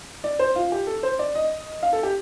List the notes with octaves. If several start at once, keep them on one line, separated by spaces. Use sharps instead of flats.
D5
C5
F4
G4
A4
C5
D5
D#5
F5
A4
G4